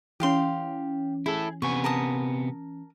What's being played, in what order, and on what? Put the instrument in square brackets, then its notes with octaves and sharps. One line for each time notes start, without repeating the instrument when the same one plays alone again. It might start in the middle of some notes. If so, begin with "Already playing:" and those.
[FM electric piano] E3 C#4 [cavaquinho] G4 F5 C6
[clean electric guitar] E4 A4 [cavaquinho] G#4
[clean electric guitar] C3 B3 G#5 [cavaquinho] C#6
[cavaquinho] A#4 A5 D#6